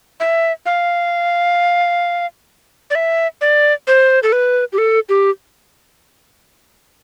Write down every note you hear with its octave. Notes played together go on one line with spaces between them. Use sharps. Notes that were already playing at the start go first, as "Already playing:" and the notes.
E5
F5
D5
E5
D5
C5
A4
B4
G4
A4
G4